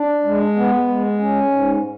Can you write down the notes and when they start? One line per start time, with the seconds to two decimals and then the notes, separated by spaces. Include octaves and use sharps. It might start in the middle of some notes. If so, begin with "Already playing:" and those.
Already playing: D4
0.24 G#3
0.56 B3
0.88 G#3
1.20 C#4
1.51 G#2